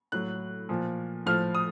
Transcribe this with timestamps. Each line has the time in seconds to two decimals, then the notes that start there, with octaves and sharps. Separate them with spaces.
0.12 A2 F#3 F#6
0.69 A#2 F3
1.26 A2 F3 F6
1.54 D#6